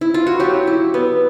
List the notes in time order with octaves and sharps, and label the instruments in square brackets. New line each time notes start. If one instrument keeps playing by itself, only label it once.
[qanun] E4
F4
F#4
F#3 G4
E4
B3